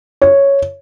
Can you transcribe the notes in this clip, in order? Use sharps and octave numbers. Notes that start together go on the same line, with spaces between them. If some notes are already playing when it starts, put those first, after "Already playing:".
C#5